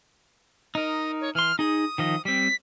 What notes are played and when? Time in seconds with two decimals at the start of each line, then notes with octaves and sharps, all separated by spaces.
0.75 D#4 A#4 D#5
1.21 C#5
1.35 E3 C6 F6
1.59 D#4 G#4 D#6
1.98 D#3 F3 D#5
2.25 G3 C4 B6